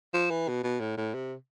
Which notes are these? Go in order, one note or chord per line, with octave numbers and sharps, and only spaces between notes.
F3
E3
B2
B2
A2
A2
C3